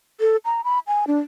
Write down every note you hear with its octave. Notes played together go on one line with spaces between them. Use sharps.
A4
A#5
B5
G#5
D4